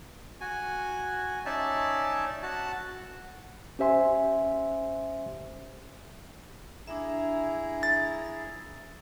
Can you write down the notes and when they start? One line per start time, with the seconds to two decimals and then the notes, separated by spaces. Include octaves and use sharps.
0.41 F#4 G#5
1.46 C#4 D#4 D5 E5 A5
2.43 F#4 A5
3.79 C#4 G4 C5 E5 G#5 C6
6.87 D4 E4 G#4 E5 A#5
7.83 A6